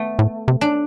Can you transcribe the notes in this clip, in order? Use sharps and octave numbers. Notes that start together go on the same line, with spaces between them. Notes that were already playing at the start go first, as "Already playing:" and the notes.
Already playing: A3 B3
A2
C3
D4